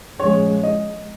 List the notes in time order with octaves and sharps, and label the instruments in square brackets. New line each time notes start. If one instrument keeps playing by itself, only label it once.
[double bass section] A#2 F3 G#3 C#4 [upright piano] C#5
[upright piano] D#5